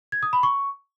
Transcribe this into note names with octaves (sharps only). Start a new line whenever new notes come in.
G#6
D#6
B5
C#6